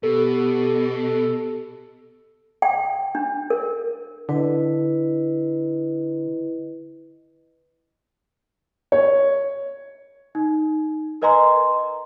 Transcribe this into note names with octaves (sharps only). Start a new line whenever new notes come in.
B2 G4 A4
G5
D4
A#4
D3 E4 B4 D#5
C#5
D#4
A#4 B4 D#5 G#5 A#5 C6